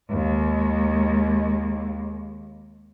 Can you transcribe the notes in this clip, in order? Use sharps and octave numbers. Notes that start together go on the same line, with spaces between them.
D#2 G#3